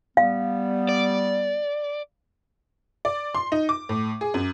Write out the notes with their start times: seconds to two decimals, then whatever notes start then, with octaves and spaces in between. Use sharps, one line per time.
0.17 G3 B3 F5
0.89 D5
3.05 D5
3.35 C6
3.52 D#4
3.69 D6
3.89 A2
4.21 G#4
4.34 F#2